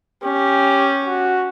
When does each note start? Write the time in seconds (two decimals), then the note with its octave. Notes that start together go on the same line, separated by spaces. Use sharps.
0.24 C#4 G4
1.05 F#4